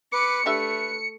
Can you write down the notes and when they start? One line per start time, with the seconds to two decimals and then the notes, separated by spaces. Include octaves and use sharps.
0.12 B4 D6 C#7
0.46 A3 D4 G4 B4 E5